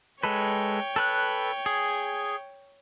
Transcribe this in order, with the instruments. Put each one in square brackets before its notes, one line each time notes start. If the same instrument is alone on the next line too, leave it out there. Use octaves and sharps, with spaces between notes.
[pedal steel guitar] G#3 A4 B4 [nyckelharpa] C#5 G5
[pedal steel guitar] A4 B4 F#6
G#4